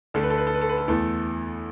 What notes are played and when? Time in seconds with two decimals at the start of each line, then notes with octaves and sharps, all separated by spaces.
0.14 D2 D3 A3 A4
0.23 B4
0.30 A4
0.38 B4
0.47 A4
0.55 B4
0.61 A4
0.69 B4
0.78 A4
0.88 E2 E3 A3 A4